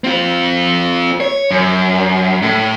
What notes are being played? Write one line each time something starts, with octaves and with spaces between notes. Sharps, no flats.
C4 F4
C#5
F#2
A2